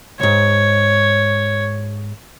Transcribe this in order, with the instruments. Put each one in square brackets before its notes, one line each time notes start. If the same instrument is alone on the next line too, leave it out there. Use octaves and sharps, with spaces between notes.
[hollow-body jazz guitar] C2 G#2 [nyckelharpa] C#5